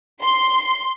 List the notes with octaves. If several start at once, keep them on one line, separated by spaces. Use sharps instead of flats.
C6